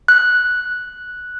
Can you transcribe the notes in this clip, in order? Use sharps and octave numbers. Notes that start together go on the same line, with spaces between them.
F#6